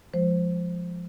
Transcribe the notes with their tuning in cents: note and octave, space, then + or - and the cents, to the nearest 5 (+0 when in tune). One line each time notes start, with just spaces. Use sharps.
F3 +0 G#3 +0 C5 +0